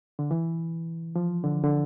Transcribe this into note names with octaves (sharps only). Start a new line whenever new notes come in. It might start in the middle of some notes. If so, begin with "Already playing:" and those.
D3
E3
F3
D3
D3